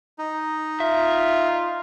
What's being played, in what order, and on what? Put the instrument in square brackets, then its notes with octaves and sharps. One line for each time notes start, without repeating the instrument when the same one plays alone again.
[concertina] D#4
[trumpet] F4 [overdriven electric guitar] E5